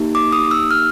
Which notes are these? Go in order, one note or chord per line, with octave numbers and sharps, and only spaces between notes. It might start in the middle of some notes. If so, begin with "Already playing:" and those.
Already playing: A#3 D#4 G4
D6
D#6
E6
F6